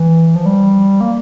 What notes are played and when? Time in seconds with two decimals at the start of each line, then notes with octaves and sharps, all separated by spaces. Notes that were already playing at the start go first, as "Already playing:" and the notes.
Already playing: E3
0.35 F3
0.46 G3
1.01 A#3